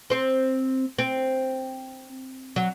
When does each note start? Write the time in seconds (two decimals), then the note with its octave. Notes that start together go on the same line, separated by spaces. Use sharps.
0.10 C4 C5
0.99 C4
2.56 F#3